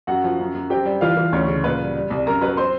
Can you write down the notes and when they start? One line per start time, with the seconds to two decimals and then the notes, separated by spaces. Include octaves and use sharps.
0.07 F#2 F#4 F#5
0.24 F3
0.40 F#2
0.55 F#2
0.70 C4 G4 G5
0.85 G3
1.01 E3 F4 F5
1.17 E3
1.33 D2 C#4 C#5
1.48 C#3
1.63 A#2 B4
1.80 G3
1.96 G3
2.10 C2
2.26 F#2 A#4 A#5
2.41 F#3 B4 B5
2.57 C4 C5 C6